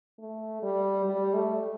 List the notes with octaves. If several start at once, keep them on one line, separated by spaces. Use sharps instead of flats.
A3
G3
G3
A3